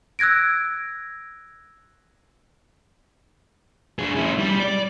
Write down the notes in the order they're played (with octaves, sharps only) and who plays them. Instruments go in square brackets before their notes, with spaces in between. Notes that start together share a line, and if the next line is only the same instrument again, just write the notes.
[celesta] E6 F#6 G#6 A#6 D7
[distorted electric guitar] D4 G#4
C#4 E4
G3
D5